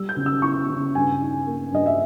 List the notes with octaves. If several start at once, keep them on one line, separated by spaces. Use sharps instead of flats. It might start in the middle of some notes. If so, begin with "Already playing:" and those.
Already playing: G3 E6
G6
C#3
E6
E4 C#6
C#3
G2 G#5
D#4
A#3
G2 D#5
E5